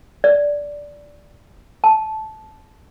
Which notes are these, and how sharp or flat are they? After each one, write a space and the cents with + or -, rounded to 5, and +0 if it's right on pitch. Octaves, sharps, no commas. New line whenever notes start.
D5 -10
A5 -15